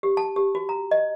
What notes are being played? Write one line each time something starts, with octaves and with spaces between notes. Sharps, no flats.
G4
A5
G4
F#4
A#5
D#5